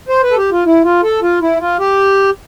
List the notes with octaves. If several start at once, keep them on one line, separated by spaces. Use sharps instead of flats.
C5
B4
A4
G4
F4
E4
F4
A4
F4
E4
F4
G4